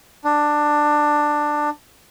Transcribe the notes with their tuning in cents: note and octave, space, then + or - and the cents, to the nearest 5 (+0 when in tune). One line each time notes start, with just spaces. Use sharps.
D4 +15